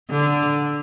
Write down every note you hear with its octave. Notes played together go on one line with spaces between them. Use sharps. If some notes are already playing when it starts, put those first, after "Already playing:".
D3